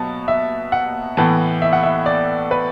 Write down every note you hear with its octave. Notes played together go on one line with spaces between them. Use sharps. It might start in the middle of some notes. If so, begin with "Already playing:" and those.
Already playing: B2 F#3 B3 A5
E5
F#5
A2 E3 B3 A5
E5
F#5
E5
D5
B4